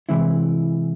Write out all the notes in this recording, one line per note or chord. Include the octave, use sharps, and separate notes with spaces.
C3 E3 G#3 C4 E4